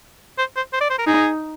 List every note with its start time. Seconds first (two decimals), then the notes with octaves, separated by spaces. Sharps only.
0.38 C5
0.56 C5
0.73 C5
0.81 D5
0.90 C5
0.98 A#4
1.07 D#4 G#4